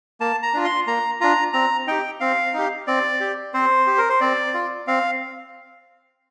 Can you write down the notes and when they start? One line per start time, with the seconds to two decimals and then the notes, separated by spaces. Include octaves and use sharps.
0.20 A#3 A5
0.43 A#5
0.54 D4 F4
0.65 C6
0.87 A#3 A#5
1.21 D4 F4 A#5
1.53 C4 A#5
1.87 D#4 G4 G5
2.20 C4 F5
2.54 D#4 G4
2.87 C4 D5
3.20 G4
3.54 C4 C5
3.87 G4
3.98 A#4
4.09 C5
4.21 C4 D5
4.54 F4
4.87 C4 F5